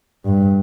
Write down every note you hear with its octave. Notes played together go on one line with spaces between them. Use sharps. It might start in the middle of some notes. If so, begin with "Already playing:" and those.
G2